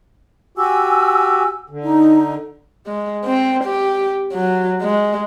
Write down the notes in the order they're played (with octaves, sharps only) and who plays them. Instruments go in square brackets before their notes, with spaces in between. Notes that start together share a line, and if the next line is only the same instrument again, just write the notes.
[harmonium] F#4 G4 [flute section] G#5 E6
[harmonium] D3
[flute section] D#4
[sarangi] G#3
C4
G4
F#3
G#3